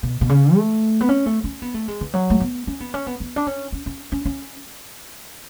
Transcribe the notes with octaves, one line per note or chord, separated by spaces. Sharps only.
B2
B2
C#3
A3
B3
C#4
A3
C#4
B3
A3
G#3
E3
F#3
A3
B3
C#4
B3
C#4
B3
B3
D4
C#4
C#4
C#4
C#4
C#4